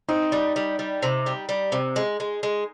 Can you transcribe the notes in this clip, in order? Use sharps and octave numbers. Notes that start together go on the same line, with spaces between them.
C4 D#4
G3
G3
G3
C3
G3
G3
C3
G#3
G#3
G#3